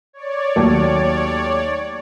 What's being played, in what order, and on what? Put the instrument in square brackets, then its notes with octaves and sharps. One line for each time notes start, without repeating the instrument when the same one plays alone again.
[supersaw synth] C#5 D5
[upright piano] D#2 F#3 A3